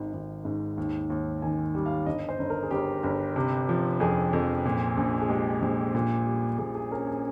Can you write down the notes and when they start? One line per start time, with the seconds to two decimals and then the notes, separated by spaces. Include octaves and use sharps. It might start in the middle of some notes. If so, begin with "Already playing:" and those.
Already playing: G#1 D#3
0.13 G#1
0.45 G#2
0.78 D#2
1.10 D#2
1.42 D#3 G#5
1.75 G3
1.86 F5
2.06 G1 D#5
2.29 C5
2.39 G1
2.50 A#4
2.63 G#4
2.71 G1 G4
3.04 G1
3.36 C3
3.69 F3
4.00 F2 G#4
4.33 F2
4.65 A#2
4.97 A#1
5.21 G#4
5.29 G#3 G4
5.62 A#1
5.95 A#2
6.26 G3
6.58 A#2 G#4
6.75 G#4
6.91 C#4 A#4
7.07 G#5